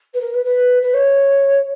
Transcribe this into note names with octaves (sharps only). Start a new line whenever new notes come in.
B4
A#4
B4
B4
B4
C#5